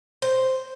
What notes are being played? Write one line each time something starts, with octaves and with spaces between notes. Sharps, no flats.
C5